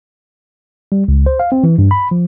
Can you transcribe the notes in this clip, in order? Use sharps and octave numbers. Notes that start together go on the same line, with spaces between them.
G3
C#2
C5
F5
C4
E3
G2
B5
F3